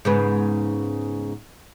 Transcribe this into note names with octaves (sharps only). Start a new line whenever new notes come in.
G#2 C#3 B3